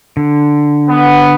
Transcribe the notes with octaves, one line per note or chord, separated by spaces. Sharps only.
D3
B3